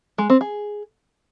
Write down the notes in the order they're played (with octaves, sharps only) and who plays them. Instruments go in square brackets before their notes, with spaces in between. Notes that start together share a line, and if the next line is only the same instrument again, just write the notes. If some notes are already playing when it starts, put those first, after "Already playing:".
[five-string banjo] G#3
C4
G#4